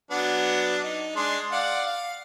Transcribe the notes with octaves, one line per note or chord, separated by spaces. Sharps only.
F#3 B3 D4
D#4
G#3 D4 C6
D5 F5 F#5
F5